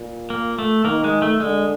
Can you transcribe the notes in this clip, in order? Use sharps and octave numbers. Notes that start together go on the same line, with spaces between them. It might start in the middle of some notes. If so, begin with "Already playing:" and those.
Already playing: A#2
A#3
A3
D#3 A#3
G#3
A3
D3 G#3